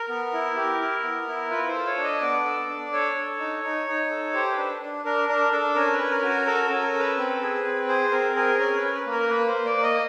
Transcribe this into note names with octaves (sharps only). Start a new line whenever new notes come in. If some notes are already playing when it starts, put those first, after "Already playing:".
Already playing: A#4
B3
E4
G4
E4
B3
E4
F4 B4
C5
A4
C#5
D4
D#5
B3 D5
A4
D4
A4 C#5
A4
D#4
D#4
D#4
A4
G4 C5
B4
D4
D4
D4 A#4
D4 A#4
D4 A4
C#4 A#4
B4
C#4
A#4
F#4
A#4
A4 A#4
A4
C#4
A#4
A4
B4
C4
G#4
C4
G#4 C5
C4 A#4
G#4 A#4
C#4 A#4
B4
C#4
B4
A#3
A#4
A#3 B4
C5
A#3
D5
A#3
D#5